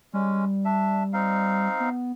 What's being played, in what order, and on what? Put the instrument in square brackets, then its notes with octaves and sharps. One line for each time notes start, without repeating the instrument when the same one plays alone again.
[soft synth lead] G3 [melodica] G#3 C#4
[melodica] D4 E5
C4 D#4 F5
[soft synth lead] B3